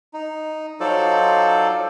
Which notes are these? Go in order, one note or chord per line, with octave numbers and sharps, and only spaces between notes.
D#4
F#3 D#4 F4 A4 C5 D5